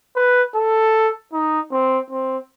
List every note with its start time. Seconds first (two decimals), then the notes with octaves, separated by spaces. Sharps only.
0.16 B4
0.55 A4
1.33 D#4
1.72 C4
2.10 C4